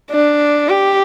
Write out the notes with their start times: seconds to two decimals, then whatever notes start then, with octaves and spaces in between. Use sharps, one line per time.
0.10 D4
0.68 G4